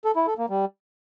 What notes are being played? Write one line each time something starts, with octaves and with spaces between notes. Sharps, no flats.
A4
E4
A4
A#3
G3